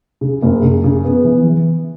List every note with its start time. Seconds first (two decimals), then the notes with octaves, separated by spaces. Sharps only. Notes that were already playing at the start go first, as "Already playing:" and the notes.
0.21 C#3
0.42 F#1
0.62 C#3
0.84 C#3
1.05 B3
1.25 E3